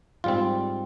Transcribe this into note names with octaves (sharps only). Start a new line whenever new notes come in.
G#2 G3 C4 F4